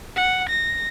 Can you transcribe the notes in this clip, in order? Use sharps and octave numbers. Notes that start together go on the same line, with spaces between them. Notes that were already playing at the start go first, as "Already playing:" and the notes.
F#5
A#6